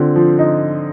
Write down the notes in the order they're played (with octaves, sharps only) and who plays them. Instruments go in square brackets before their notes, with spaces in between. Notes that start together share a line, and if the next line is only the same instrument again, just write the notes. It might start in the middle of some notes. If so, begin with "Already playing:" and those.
Already playing: [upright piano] D3 C4 [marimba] F4
[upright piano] F3
D#4